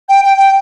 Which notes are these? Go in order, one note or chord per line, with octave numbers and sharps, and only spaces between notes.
G5
G5
G5